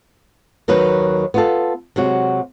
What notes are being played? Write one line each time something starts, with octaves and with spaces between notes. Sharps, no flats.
D#2 D#3 F#3 D#4 B4
B3 F4 A4
C3 F#3 G#3 F#4